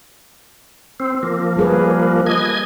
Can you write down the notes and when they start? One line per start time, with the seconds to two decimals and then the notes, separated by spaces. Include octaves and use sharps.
1.00 C4
1.23 F3 A#3
1.57 G3 G#4 B4
2.26 D#5 G#6